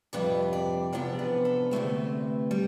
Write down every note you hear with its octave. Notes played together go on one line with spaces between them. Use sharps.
F2 C3 G3 D4 B4
D5
E2 C3 F3 B3 D4 D5
B4
A4
D2 C3 F3 A3 C4 B4
G3